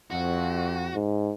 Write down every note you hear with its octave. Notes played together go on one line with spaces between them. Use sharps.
F2 F#4
G#2